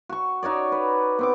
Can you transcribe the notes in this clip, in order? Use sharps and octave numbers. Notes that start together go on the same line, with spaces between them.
F#4 C#6
D#4 F#4 C#5 D5
B4
B3 C4 D6